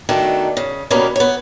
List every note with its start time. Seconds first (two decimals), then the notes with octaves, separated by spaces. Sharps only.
0.09 B2 D#3 A3 D4 A4
0.57 C#3
0.91 B2 D#3 G3 A#3 B3 C#4
1.16 B3 C#5